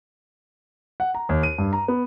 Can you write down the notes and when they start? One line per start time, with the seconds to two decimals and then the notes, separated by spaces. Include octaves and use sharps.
1.00 F#5
1.15 A#5
1.29 D#2
1.43 D#7
1.58 G2
1.73 A#5
1.88 B3